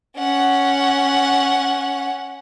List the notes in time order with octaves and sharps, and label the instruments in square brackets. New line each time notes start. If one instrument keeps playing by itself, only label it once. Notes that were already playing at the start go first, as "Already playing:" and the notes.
[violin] C#4 F#5